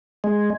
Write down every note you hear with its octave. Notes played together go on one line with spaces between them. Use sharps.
G#3